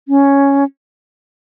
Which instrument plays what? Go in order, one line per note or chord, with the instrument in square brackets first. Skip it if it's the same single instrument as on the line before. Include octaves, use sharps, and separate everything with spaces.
[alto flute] C#4